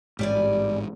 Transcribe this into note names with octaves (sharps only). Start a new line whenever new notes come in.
A1 G#2 G3 D5 G#5